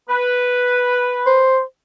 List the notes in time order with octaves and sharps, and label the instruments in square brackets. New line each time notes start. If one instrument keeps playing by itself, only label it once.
[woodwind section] B4
[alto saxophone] C5